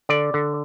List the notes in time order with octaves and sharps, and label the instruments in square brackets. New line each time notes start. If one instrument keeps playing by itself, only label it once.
[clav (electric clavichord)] D3 D5
D3